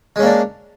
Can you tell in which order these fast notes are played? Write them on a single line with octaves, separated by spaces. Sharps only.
G#3 C#4 A#3 D4